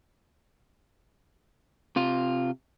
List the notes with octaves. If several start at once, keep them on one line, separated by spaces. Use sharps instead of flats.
C3 F4